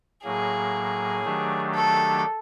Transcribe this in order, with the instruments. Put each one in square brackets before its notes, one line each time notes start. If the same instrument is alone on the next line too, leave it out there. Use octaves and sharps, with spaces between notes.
[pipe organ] A2 F#3 A#3 [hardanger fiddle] G#4
[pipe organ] D#3 F#3 A3 D4 G4
[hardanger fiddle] A4